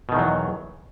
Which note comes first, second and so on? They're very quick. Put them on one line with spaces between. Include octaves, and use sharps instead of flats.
B2 D#3 E2 F#3